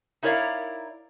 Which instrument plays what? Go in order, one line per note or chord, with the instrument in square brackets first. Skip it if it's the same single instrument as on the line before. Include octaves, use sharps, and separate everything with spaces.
[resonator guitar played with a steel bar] D#4 E4 A#4 C#5 D5 F5